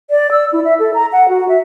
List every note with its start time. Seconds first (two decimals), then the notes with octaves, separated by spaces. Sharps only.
0.10 D5
0.31 E6
0.53 E4
0.65 E5
0.80 A4
0.94 A#5
1.13 F#5
1.29 F#4
1.49 E5